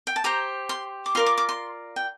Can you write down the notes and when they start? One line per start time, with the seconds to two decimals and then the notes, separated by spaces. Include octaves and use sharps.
0.07 G5
0.16 A5
0.24 G4 C5 A#5
0.69 C6
1.06 D6
1.15 F4 A#4 D5 C6
1.26 D6
1.38 D6
1.49 C6
1.96 G5